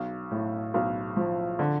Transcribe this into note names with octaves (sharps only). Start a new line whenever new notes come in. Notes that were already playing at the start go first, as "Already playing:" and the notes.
Already playing: B1
A2
B1
F3
D3